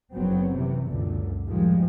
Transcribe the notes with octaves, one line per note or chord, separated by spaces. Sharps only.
F#1 F#3 B3 C4
C3 E3
C#2 F#2 A#2 D3
A2 D#3 F3 G3 G#3